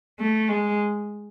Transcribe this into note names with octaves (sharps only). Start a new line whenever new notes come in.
A3
G#3